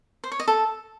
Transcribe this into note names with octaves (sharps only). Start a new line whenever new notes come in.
C5
C#5
D#5
A4